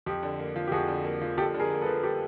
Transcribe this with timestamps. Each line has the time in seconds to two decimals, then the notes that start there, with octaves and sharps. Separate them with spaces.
0.06 F2 G4
0.23 D3
0.39 A#3
0.56 F3
0.67 G4
0.71 F2 F#4 G#4
0.88 D3
1.04 A#3
1.21 F3
1.37 F2 G4 A4
1.54 D3
1.59 G#4 A#4
1.70 A#3
1.81 A4 B4
1.86 F3
2.03 G4 A4